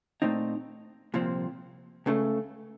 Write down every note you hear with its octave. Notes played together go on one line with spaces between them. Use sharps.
A#2 A3 C4 D#4
C2 A#2 F3 C4
C#2 C#3 A3